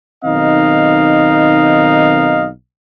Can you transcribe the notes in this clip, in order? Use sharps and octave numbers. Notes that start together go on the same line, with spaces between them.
B1 D#3 C4 D#4 D#5 F5